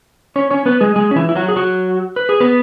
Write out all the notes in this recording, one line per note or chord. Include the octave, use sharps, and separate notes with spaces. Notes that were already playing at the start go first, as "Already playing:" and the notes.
C#4 C#5
C#4 C#5
B3 B4
G#3 G#4
G#3 G#4
C#4
E3 E4
E4
F#3 F#4
G#4
F#3 F#4
B4
G#4
B3 B4